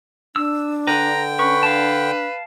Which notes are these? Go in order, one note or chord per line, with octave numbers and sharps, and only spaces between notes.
D4 E6
D3 B4 G5 A#5
C#4 B4 C#6
D4 F5 A5